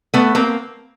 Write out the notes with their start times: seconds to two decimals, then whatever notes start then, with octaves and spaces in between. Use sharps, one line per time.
0.14 A3 B3
0.35 A#3 C4